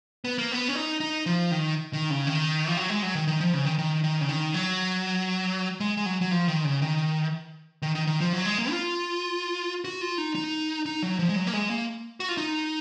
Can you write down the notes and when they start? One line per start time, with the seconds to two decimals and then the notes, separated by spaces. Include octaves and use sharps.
0.24 B3
0.38 A#3
0.52 B3
0.68 C#4
0.75 D#4
1.00 D#4
1.26 F3
1.51 D#3
1.93 D#3
2.10 C#3
2.27 D#3
2.68 F3
2.77 F#3
2.90 G#3
3.03 F#3
3.15 D#3
3.28 D#3
3.41 F3
3.53 C#3
3.65 D#3
3.79 D#3
4.04 D#3
4.21 C#3
4.29 D#3
4.54 F#3
5.80 G#3
5.97 G#3
6.06 F#3
6.21 F#3
6.31 F3
6.48 D#3
6.64 C#3
6.82 D#3
7.82 D#3
7.95 D#3
8.07 D#3
8.21 F3
8.33 F#3
8.46 G#3
8.58 A#3
8.71 F4
9.85 F#4
10.01 F4
10.18 D#4
10.35 D#4
10.86 D#4
11.03 F#3
11.19 F3
11.29 G#3
11.36 F#3
11.47 A#3
11.53 G#3
11.70 A#3
12.20 F#4
12.29 F4
12.37 D#4